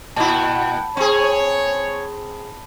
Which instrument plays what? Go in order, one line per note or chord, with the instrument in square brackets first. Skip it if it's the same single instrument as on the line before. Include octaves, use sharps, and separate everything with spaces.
[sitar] A#2 E4 [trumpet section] F#5 G5 [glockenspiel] A5 B5
[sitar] C4 G#4 [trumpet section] C#5